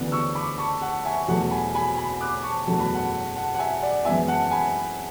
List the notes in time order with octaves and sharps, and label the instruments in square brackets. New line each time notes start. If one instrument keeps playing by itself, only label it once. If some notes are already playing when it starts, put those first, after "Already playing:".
Already playing: [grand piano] D2 C#3 E3 B3 D4
[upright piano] C#6 E6
B5 D6
A5 C#6
F#5 A5
E5 G#5
[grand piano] E2 B2 F#3 A3 [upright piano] F#5 A5
[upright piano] G#5 B5
G#5 B5
G#5 B5
D6 F#6
A5 C#6
[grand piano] F#1 E2 B2 F#3 A3 [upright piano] A5
[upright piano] B5
F#5 A5
F#5 A5
F#5
E5 G#5
D5 F#5
[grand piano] F#2 E3 G#3 B3 E4 [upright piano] E5 G#5
[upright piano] F#5 A5
G#5 B5